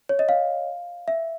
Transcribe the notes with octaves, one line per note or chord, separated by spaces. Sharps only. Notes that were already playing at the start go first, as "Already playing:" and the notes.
C#5
D#5
F5
E5